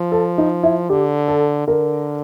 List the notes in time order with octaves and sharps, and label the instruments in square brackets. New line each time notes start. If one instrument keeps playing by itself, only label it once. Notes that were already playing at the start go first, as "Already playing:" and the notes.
Already playing: [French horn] F3
[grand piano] A4
D#4
E4
[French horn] D3 [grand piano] G4
[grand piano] A4
[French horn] D3 [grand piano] A#4